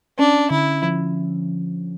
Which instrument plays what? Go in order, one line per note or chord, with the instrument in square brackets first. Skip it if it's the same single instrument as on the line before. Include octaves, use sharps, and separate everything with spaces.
[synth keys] C#4 [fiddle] D4
[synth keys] D3 [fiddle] E4
[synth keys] F3